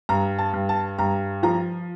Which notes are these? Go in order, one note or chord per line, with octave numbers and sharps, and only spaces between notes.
G2 A#5
A5
G2
A5
G2 A#5
F3 A#5